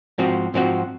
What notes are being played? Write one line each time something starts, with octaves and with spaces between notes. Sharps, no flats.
G#2 F3 C4 F#4
G#2 F3 C4 F#4